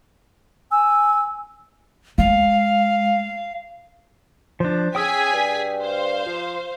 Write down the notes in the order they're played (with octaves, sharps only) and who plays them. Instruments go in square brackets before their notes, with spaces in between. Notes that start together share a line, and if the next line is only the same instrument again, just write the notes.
[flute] G#5 [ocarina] E6
[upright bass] G#3 [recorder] F5
[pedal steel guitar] F3 D4 [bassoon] C5
[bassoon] C#4 [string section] G#4 G#5 B6 [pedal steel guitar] G5 D#6 E6
[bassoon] G2
[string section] C5 F5
[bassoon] F3